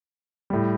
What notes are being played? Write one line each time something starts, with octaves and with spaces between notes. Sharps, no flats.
A2 G3